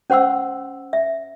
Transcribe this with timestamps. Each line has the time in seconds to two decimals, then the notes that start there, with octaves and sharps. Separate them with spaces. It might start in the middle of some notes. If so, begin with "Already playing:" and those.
0.10 C#4 C5 F#5 C6 E6
0.93 E5